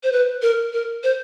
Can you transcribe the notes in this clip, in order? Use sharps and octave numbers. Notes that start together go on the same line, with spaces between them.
C5
B4
A#4
A#4
C5